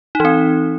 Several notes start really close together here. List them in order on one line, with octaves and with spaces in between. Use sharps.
D#4 E3 C4